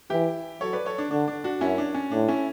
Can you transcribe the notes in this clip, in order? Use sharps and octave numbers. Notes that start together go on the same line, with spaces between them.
E3 E4 G4
F#3 A4 C#5
B4 D5
A4 C#5
D4
D3 D4
D4
D4 F#4
F#2 C#4 E4
D4
C#4
A2 D4
C#4 E4